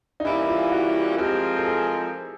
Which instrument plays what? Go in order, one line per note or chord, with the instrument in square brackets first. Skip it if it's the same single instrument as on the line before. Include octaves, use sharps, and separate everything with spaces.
[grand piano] D#4
[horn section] E3 G3 A#3 C#4 [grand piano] E4
[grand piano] F4
F#4
[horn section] F3 G#3 C4 F4 A#4 [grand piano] G4
[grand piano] A4
G#4